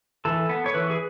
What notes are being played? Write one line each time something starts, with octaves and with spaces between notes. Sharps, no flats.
E3 A4
B3
C#5
E3 B4
G#4